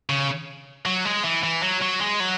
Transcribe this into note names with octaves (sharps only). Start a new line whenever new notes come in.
C#3
F#3
G#3
E3
E3
F#3
F#3
G#3
F#3